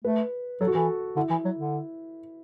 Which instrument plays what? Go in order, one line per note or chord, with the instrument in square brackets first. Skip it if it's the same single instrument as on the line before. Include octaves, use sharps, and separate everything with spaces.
[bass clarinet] A3 [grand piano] B4
[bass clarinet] F#3 [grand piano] A4
[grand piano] F#4
[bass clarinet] E3 [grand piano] A4
[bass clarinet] D3 [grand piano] E4
[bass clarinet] E3
F#3
D3